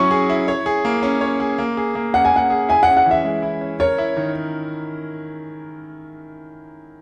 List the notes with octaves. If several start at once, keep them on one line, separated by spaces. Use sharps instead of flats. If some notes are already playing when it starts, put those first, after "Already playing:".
Already playing: F#3 C#4 E4 C#6
G#4
E4
C#5
G#4
A#3
C#4
C#5
G#4
A#3
G#4
A#3
C#4 F#5
G#5
A#3 F#5
G#4
E4 G#5
C#4 F#5
F#5
E3 E5
G#3
E4
C#4
A#4 C#5
E4
D#3